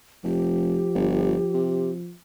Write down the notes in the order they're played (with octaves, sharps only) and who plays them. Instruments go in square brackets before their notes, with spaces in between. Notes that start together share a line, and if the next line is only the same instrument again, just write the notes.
[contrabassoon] F1 [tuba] F3 [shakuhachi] G4
[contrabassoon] G1
C3